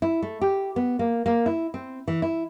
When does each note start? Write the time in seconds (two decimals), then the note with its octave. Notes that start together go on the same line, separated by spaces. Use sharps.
0.02 E4
0.22 A3
0.41 G4
0.76 B3
0.99 A#3
1.26 A#3
1.46 E4
1.74 C4
2.08 E3
2.22 E4